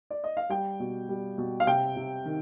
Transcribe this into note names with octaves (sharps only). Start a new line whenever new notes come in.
D5
D#5
F5
G3 G5
B2
G3
B2
F5
C3 G5
C3
D#3